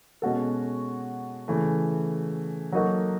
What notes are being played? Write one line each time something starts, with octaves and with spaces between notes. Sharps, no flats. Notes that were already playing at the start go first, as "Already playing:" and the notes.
B2 G#3 C#4 F#4 A4
C#3 E3 A3
F#3 A#3 D#4 F#4 A4